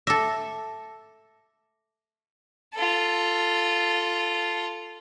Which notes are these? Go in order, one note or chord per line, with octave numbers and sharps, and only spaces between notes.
A4 E5 A5 D6 A#6
F4 A4